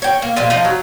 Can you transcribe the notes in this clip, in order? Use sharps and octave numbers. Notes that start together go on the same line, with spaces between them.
C#5 G5
A#3
A#2 F3 G#3 F4
F3 D#4 F4 D#5
F#3